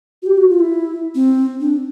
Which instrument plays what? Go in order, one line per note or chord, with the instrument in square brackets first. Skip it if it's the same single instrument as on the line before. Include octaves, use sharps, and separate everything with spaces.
[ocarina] F#4
G4
F#4
F4
E4
C4
D4